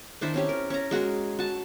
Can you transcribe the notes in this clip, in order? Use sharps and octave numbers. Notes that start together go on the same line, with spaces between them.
D#3 D4 E4 C5
C4 C#4 G4
A#4
C#4 A#5
G#3 F#4 G#4 A#4
F#4 A5